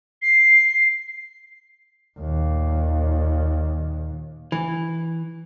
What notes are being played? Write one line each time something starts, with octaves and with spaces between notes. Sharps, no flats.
C7
D#2 A#2
E3